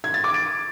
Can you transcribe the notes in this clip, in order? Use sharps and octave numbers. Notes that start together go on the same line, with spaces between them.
G#6
A6
D6
D7